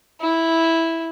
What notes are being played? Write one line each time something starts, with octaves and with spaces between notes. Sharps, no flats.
E4